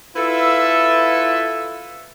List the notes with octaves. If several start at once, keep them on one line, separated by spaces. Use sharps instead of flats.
E4 F4 A4 B4 E5